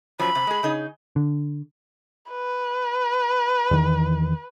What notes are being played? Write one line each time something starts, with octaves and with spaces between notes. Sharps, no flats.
F#2 F3 F#3 B5
C3
G#3 G#4
C#3 D#4 G#4
D3
B4
E2 D#3 E3